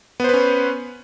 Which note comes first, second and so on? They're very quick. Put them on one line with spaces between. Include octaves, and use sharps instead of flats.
B3 C5 B4 C#4